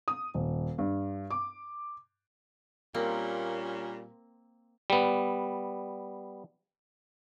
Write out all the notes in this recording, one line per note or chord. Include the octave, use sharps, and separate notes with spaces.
D#6
D#1
G2
D6
A#2 G3 A#3 C4 C#4
G3 B3